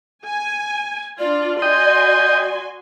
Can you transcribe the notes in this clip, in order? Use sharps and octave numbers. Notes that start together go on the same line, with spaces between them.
G#5
D4 F4 D5
F#4 D#5 G5 G#5 C6